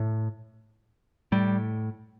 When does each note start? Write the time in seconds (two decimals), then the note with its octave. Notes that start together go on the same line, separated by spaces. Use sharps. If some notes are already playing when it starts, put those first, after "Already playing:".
Already playing: A2
1.32 A2 G3